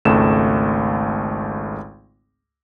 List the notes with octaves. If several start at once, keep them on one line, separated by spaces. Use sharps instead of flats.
G#1 C#2 A3 E7